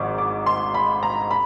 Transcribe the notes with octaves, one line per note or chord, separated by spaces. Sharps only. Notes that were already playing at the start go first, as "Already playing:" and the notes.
Already playing: G#1 G#2 F3 C#6 D6
D6
C6
B5
A#5
B5